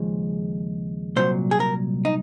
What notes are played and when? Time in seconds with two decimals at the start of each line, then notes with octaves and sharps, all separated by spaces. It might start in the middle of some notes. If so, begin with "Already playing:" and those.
Already playing: D#2 C#3 F3 G#3
1.16 C2 A#2 F#3 C5
1.51 G#4
1.60 A#4
2.05 D#4